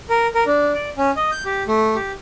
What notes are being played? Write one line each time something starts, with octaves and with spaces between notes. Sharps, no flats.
A#4
A#4
D4
D5
C#4
D#5
G6
G4
A3
G4